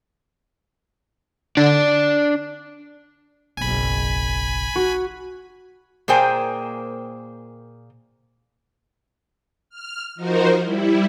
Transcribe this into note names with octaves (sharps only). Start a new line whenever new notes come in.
D3 D4 D5
F#1 B1 G#5 B5
F#4
A#2 A#3 G#4 C5 G5 G#5
F6
F3 D#4 F#4 A#4 C5
G3 E4